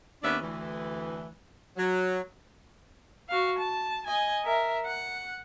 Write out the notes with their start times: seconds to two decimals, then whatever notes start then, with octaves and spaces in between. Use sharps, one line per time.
0.23 D#2 B3 C#4 D4 D5 E5
0.42 D2 E3
1.77 F#3
3.29 F#4 F5
3.59 A5
4.07 D#5 G#5
4.44 A#4 E5
4.86 F#5